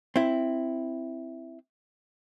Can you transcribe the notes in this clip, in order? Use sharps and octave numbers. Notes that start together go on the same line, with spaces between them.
C4 E4